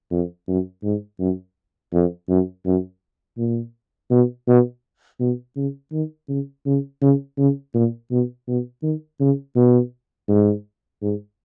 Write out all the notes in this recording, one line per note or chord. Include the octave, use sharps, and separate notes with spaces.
F2
F#2
G#2
F#2
F2
F#2
F#2
A#2
B2
B2
B2
C#3
D#3
C#3
C#3
C#3
C#3
A#2
B2
B2
D#3
C#3
B2
G#2
G#2